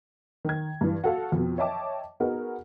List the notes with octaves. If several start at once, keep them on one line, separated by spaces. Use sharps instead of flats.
D#3 G#6
G2 E3
F#4 A4 F5
F2 B2
C#5 D#5 E5 G5 A5 D6
B3 D#4 F#4 G#4 A#4